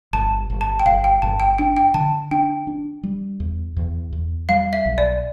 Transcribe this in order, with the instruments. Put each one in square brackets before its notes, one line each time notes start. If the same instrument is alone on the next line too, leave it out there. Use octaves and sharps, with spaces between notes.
[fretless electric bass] G1 [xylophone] A5
[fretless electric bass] G1
[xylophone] A5
G5
[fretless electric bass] G1 [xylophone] F5
[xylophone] G5
[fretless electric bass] G1 [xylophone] A5
[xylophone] G5
[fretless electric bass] D4 [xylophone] G5
[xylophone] G5
[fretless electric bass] D3 [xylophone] A5
[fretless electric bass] D4 [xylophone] G5
[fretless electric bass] D4
G3
E2
E2
E2
[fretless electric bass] G3 [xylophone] F5
[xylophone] E5
[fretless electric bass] B1
[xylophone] D5